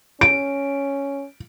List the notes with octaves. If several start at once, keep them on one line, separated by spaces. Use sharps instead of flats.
C#4 D7